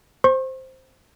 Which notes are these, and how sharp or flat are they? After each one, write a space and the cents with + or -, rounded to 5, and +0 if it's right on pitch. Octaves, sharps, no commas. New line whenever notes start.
C5 +0 C#6 -45